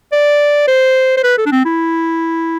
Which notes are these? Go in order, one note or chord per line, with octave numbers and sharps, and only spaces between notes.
D5
C5
C5
B4
A4
D4
C4
E4